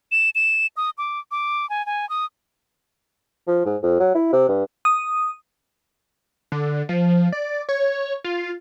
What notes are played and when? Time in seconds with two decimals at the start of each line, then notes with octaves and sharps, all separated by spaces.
0.12 E7
0.35 E7
0.77 D#6
0.98 D6
1.31 D6
1.70 G#5
1.86 G#5
2.09 D#6
3.47 F3
3.66 G#2
3.83 F2
4.00 F#3
4.15 E4
4.33 C3
4.49 G2
4.85 D#6
6.52 D3
6.89 F3
7.32 D5
7.69 C#5
8.24 F4